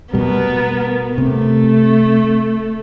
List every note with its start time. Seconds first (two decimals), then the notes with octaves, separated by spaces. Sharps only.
0.13 B2 G3 B3 A#4
1.18 C3 A3